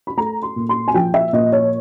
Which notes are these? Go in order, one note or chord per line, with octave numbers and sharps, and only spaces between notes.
B5
A3 A#5
C6
A#2
C6
G#5
F3 G5
E5
A#2 D#5
C#5